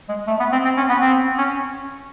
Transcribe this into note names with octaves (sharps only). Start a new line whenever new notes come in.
G#3
A3
B3
C4
C4
C#4
B3
C4
C#4